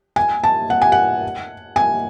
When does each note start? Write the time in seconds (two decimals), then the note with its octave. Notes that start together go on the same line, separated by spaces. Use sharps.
0.16 G#5
0.44 A5
0.70 F#5
0.82 G#5
0.92 F#5
1.76 G#5